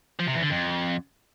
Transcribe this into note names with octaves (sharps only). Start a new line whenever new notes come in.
F3
C3
E2
D3
F2